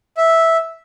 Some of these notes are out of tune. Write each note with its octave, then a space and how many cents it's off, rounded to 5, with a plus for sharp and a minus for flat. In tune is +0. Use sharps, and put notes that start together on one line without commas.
E5 -5